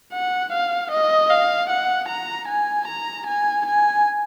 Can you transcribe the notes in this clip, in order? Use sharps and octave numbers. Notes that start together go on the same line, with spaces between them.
F#5
F5
D#5
F5
F#5
A#5
G#5
A#5
G#5
G#5